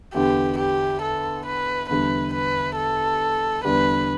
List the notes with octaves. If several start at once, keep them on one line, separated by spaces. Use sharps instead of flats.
E2 D3 B3 G4
G4
A4
B4
E2 D3 G3 B4
B4
A4
E2 D3 G3 D4 B4